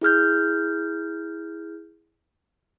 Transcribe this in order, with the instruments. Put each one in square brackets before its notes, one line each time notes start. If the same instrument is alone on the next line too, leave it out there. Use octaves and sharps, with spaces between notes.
[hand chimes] E4 G#4 F6 G6